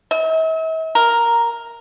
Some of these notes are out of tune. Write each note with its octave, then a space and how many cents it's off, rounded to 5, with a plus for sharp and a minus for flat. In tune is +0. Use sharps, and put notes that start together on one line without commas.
E5 -45
A#4 +0